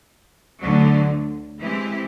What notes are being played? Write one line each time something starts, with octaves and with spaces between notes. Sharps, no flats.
D2 D3 F#3
E3 G#3 C4 E4 G4